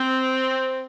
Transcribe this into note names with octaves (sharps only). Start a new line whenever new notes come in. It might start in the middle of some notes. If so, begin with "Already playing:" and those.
Already playing: C4